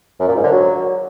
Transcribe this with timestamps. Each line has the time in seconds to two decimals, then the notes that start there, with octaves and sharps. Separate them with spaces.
0.20 F#2
0.28 A#2
0.36 G#2
0.44 D3
0.52 F#3